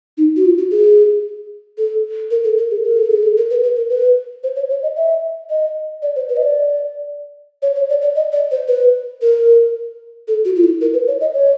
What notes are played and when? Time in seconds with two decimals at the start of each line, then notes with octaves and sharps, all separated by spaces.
0.17 D#4
0.36 F#4
0.45 F4
0.58 F#4
0.71 G#4
1.78 A4
2.31 A#4
2.44 A4
2.58 A#4
2.71 G#4
2.84 A#4
2.97 A4
3.10 G#4
3.23 A4
3.37 A#4
3.50 B4
3.63 B4
3.76 A#4
3.90 B4
4.43 C5
4.56 C#5
4.70 C#5
4.83 D#5
4.96 E5
5.50 D#5
6.02 D5
6.16 C5
6.29 B4
6.37 D#5
6.42 D5
7.62 C#5
7.75 C#5
7.89 D5
8.01 D5
8.15 D#5
8.32 D5
8.51 C5
8.68 B4
9.22 A#4
10.28 A4
10.45 F#4
10.56 F4
10.64 E4
10.81 A#4
10.94 B4
11.07 C#5
11.21 D#5
11.34 C#5